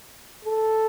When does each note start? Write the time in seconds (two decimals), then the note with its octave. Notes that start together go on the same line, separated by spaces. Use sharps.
0.44 A4